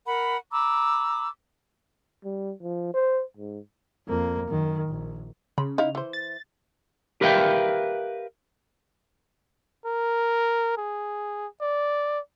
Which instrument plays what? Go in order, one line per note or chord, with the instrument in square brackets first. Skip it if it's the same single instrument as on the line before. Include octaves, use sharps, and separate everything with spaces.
[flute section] A#4 F#5 B5
A#5 B5 D6 E6
[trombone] G3
F3
C5
G#2
[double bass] F2 A#3
F#2 D#3
A#1
[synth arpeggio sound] C#3 [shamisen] B5
[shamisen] D#4 E4 F5
E3 C5
[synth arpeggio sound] A6
[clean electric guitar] G4 A#4 B4 E5 F5 G5
[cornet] A#4
G#4
D5